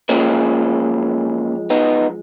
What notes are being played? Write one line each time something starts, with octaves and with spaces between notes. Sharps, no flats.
F#2 F3 G#3 A#3 C#4
B3 D#4